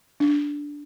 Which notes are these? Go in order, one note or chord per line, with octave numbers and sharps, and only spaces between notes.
D4